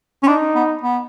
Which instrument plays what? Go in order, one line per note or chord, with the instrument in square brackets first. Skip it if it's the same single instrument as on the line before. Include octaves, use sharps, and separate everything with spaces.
[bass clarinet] C#4
[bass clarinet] D4 [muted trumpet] D#4
[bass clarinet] B3
B3